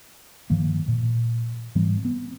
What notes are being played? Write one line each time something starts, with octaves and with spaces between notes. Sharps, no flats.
G2 D#3 F3 A#3
A#2
G#2 E3 G3 C4
B3 C4